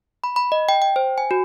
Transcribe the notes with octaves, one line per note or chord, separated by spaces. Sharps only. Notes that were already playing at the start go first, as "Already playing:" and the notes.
B5
B5
D#5
G5
G5
C5
G#5
F#4